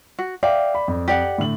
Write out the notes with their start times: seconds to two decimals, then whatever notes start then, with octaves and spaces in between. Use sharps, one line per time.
0.19 F#4
0.43 D5 E5 F5 G5
0.75 B5
0.88 F2
1.08 G4 D5 F#5
1.38 A2 D3 F#7